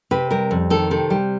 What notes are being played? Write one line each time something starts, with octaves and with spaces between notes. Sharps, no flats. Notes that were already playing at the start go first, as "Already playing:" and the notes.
C3 B4
G3 A#4
F2
D#3 A4
C3 A4
G3